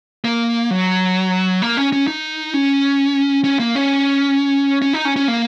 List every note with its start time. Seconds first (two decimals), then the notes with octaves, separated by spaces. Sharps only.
0.24 A#3
0.71 F#3
1.62 A#3
1.77 C#4
1.92 C#4
2.07 D#4
2.54 C#4
3.44 C#4
3.59 A#3
3.75 C#4
4.82 C#4
4.93 D#4
5.05 C#4
5.16 C#4
5.28 A#3